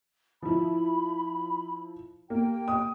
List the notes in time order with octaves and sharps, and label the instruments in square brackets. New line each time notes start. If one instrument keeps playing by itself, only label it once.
[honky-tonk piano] F3 E4 [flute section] B5
[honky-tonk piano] A#3 [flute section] G4 G5
[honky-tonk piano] D#6